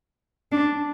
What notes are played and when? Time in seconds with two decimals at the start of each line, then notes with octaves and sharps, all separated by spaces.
0.52 D4